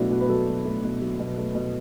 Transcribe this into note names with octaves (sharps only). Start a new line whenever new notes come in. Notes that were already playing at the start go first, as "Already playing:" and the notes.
Already playing: B2 F#3 A3 D4 E4 F#4
B2 F#4
B4
F#3 A4
B2
A3
B2
F#3
B2
A3
B2